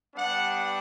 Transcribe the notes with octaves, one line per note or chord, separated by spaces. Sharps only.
G3 B3 D4 F#5